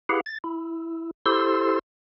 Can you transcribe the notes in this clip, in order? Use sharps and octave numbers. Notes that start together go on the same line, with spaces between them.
E4 G4 G#4 B4 F5 F#5
A6
E4
E4 G4 A4 C5 C6 E6